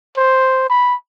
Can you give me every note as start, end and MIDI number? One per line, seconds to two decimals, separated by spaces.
0.17 0.68 72
0.70 0.95 83